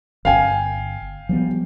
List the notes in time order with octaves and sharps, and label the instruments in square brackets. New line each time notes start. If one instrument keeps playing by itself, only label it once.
[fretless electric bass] G1 [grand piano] F5 G5 G#5
[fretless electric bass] F3 G3 B3